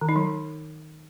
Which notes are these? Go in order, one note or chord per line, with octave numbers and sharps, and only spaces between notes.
D#3
D#4
F#3